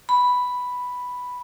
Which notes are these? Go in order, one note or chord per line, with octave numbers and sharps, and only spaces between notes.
B5